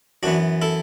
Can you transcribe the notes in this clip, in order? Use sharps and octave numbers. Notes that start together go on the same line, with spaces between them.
F#2 E3 B3 D4 F#4
E4 A4